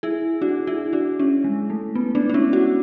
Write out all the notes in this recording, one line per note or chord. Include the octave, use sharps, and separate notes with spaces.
E4 G#4
D4 F#4
E4 G#4
D4 F#4
C#4 E4
G#3
A3
B3
B3 D4
D4
C#4 E4
D4 F#4